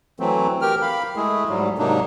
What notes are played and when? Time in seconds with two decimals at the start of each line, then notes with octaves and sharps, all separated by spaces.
0.20 E3 F#3 A3 C4
0.62 G4 A#4 G5 F6
0.82 F5 B5
1.16 G#3 A3 E4 G#4
1.49 G#2 F#3 G3
1.78 G#2 C3 F#3 A#3 D4 D#4